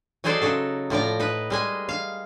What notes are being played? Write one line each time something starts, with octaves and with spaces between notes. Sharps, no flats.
F#3 D#4 G#4 A4 C5 D5
C#3 F#3 A4
A2 F3 D5 A#5
D#4 B4
G3 G#3 G#5
F5